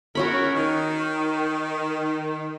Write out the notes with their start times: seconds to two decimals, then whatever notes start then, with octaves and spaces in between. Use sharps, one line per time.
0.15 C#4 F#4 G#4 A#4 C#5 B5
0.53 D#3